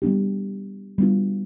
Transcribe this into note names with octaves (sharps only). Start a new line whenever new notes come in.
G3 B3 D4 G4
G3 B3 D4 F4